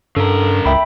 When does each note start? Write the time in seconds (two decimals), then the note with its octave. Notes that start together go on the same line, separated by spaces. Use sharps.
0.16 G2 C#3 A4 A#4
0.65 C#2 E5 G5 B5